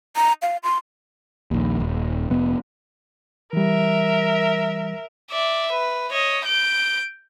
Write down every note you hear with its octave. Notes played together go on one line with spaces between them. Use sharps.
A#5
F5
C6
A#1 D#2
D#1
F1 B3
E3 G3 A#4 E5
D5 E5
B4
C#5 D#5
G6 D7